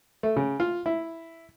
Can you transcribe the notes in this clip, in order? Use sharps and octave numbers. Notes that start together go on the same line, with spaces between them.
A3
C#3
F4
E4